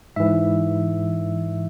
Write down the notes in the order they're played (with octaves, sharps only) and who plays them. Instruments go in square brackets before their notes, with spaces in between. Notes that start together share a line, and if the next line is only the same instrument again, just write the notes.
[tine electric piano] G#2 E3 E5